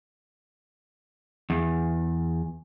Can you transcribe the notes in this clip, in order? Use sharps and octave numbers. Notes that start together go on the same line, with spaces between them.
E2